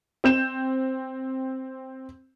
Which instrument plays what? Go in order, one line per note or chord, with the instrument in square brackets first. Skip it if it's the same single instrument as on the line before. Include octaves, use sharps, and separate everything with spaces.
[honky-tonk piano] C4 G6 E7